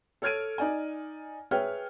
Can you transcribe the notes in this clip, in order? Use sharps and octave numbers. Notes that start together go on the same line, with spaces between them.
A4 C#5 F6 G#6 D7 D#7
D#4 D5 G#5
G#4 B4 C#5 E5 G5 F6